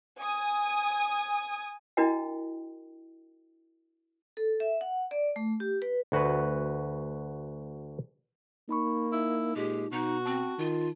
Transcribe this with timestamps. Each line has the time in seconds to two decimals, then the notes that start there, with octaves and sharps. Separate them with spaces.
0.18 G#5 D#6
1.97 D4 E4 F#4 A#4 D#5 G5
4.37 A4
4.60 E5
4.81 F#5
5.11 D5
5.36 A3
5.60 G4
5.82 B4
6.12 D2 F#4 B4
8.69 A#3 D#4 B5 C#6
9.12 D#4 E4
9.56 A#2 G#3 G4
9.92 B2 D#4 F#4
10.26 C4 A5
10.58 D#3 F4